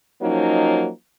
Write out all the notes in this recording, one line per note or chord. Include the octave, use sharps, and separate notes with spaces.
F3 F#3 A#3 C#4 D#4